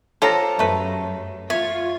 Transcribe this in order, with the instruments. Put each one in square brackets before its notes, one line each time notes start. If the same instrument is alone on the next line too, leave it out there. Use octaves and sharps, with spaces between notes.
[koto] F4 G4 C5 [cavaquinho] A4 [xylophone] C#5 A#5 A#6
[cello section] F#2 [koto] A3 B4
[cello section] F4 [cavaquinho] C#5 [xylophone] E5